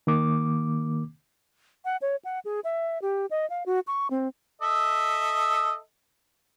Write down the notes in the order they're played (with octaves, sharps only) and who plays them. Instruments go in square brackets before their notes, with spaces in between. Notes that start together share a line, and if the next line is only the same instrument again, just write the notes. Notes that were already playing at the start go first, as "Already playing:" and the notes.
[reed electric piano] D#3 A#3 D6
[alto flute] F#5
C#5
F#5
G#4
E5
G4
D#5
F5
F#4
C#6
C4
[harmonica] A4 D#5 E5